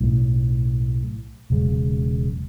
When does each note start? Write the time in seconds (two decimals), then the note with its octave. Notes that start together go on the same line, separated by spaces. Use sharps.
0.01 B1 A2
1.50 E1 C#3 F#3 G#3